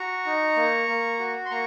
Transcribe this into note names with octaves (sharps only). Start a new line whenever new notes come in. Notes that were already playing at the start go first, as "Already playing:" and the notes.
Already playing: F#4 A#5 C#6
D#4
A#3
A#3
F#4
C6
A#3 A#5 C#6